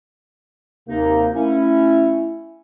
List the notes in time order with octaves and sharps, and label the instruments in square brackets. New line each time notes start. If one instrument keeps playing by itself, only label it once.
[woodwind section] D#2 D#4 [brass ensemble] C3 A#3
[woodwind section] A3 C#4 [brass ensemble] E4